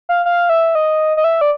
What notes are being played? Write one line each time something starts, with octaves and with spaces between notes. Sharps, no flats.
F5
F5
E5
D#5
D#5
E5
D5